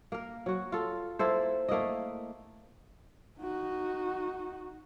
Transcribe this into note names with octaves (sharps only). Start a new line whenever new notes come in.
A#3 A#4
F#3 F#4
F4 A4
A#3 E4 A4 C5
A3 A#3 E4 D#5
D#4 F#4